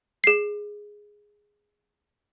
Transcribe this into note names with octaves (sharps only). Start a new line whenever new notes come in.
G#4 C7